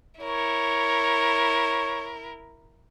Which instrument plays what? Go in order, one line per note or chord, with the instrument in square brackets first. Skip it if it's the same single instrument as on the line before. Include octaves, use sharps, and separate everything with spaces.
[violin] E4 A#4 [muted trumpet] C#5